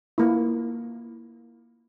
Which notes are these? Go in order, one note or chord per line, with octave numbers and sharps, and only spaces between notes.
A#3 E4